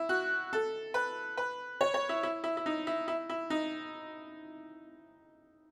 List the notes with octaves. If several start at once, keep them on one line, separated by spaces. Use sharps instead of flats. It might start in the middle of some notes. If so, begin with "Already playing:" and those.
Already playing: E4
F#4
A4
B4
B4
C#5
C#5
E4
E4
E4
E4
D#4
E4
E4
E4
D#4